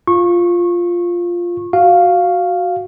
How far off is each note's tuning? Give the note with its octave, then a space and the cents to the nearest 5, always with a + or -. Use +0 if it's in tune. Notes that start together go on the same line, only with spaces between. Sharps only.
F4 +0 C#6 -25
F#4 +0 F5 +0